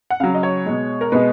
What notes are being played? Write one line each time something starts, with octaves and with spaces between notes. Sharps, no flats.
F#5
C#3 F#3 F5
D#5
C#5
B2 G#3
A#4
B2 G#3 B4